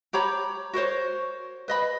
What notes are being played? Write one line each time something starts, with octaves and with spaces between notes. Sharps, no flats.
G4 C#5 A#5 B5
F#4 A#4 C5 C#5
B4 D#5 B5